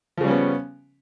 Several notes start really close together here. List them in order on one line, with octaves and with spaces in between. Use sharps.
F3 C#3 G3 C#4 B3